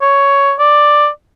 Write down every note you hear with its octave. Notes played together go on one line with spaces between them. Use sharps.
C#5
D5